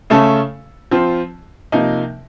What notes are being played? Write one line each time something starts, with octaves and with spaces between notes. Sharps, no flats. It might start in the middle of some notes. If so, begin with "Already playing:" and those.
C#3 A3 C#4 A4
F3 C4 F4
C3 F3 A#3 D#4